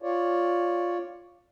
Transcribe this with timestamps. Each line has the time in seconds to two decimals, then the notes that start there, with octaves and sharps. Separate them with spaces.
0.02 F4 C#5 D5